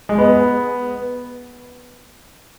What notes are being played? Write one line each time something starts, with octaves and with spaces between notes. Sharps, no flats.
G#3
B3